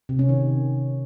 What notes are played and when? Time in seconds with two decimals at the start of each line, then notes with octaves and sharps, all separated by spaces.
0.09 C3
0.19 C#4
0.29 D#3